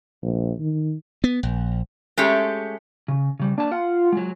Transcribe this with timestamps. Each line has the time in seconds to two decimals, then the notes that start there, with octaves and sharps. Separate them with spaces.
0.22 A#1
0.60 D#3
1.24 B3
1.43 A#1
2.17 G#3 A3 C#4 G4
3.08 C#3
3.39 C#3 G3
3.58 A#3 D4 A5
3.72 F4 F#5
4.12 F#3 G#3